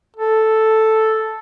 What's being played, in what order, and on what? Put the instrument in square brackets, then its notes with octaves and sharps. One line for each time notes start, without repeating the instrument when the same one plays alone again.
[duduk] A4